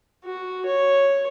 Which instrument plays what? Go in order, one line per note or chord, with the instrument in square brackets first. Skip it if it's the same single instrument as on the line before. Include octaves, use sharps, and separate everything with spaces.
[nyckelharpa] F#4
C#5